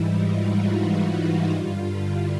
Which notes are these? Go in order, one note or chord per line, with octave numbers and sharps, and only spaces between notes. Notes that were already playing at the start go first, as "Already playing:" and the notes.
Already playing: G#2 E3 G3 D#4 E4
F4
F#4
F#4
F4
G2 D3 G3
E4